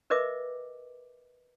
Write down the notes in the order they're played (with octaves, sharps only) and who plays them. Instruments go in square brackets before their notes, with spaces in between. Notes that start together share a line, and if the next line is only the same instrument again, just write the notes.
[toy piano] A#4 B4 D#5 E5 D6